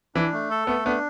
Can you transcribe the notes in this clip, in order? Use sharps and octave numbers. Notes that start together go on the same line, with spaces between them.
E3 D4
A3
A4
A3 B3
B3 D4